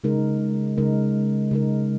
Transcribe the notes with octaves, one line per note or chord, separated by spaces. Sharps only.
C#3 G#3 D#4 A#4
C#3 G#3 D#4 A#4
C#3 G#3 D#4 A#4